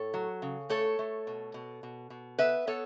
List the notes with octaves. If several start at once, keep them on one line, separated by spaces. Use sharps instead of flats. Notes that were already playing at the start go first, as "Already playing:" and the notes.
Already playing: A2 A4 C#5
F#3
C#3
A3 A4 C#5
A3
B2
B2
B2
B2
B3 B4 E5
B3 A4 C#5